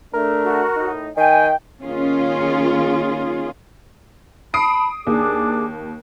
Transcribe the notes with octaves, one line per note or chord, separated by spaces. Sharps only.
A3 D4 A#4
F#4
A2 D#4
D#3 G5 G#5
D#3 A#3 C#4 F4 G#4
A5 B5 D#6 C7 D7
D#2 D4 G#4 D6